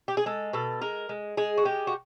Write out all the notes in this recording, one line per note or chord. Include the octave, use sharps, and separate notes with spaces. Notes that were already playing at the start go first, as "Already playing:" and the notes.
G4
G#4
G#3 A4
B2 A4
G#3 A#4
G#3
G#3 G#4
F#4
G#3 G4
F#4